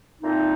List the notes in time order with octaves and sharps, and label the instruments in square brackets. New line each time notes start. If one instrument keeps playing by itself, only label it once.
[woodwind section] A#2 A3 C4 D#4